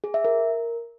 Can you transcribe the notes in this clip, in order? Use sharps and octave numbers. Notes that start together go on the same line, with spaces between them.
G#4
E5
A#4